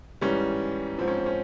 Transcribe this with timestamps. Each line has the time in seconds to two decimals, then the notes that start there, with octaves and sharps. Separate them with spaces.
0.21 G#2 E3 G3 C#4
0.98 G#2 F3 C4
1.08 C#4
1.18 C4
1.26 C#4